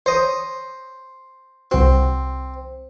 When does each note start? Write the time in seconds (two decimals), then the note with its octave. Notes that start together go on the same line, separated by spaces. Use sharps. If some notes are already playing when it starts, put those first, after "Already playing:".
0.06 C5 C#5 A#5 D#6
1.71 C2 C4 F#4